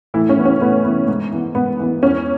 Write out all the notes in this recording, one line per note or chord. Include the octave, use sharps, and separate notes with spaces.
A2 E3 E4
C#4
E3 B3
C#4
A2 B3
E3 B3
G#2
E3 B3
G#2 B3
E3 B3
E2 C#4